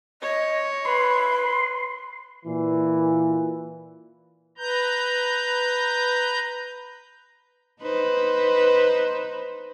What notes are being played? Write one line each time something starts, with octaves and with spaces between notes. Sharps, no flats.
C#5 D#5
B4 B5 C6
A#2 E3
B4 A#5 G6
D#4 B4 C5